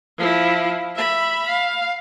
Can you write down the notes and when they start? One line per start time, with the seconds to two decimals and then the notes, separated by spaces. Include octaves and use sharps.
0.18 F3 E4
0.95 E5 B5
1.48 F5